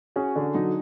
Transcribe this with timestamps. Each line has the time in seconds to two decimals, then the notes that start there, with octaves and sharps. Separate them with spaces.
0.16 C#4 F#4 G#4
0.35 D3 D4
0.54 F#3 D#4